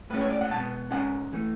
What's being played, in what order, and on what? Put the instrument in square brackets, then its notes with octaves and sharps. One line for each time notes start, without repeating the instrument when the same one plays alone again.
[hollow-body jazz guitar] A2 G#3 C#4 B4
C#5
D5
F#5
B2 G#3 B3 A5
G#2 G#3 C#4 F#5
E3 A3